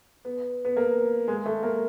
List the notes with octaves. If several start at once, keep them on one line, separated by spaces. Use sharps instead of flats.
B3
B3
A#3
G#3
A3
A#3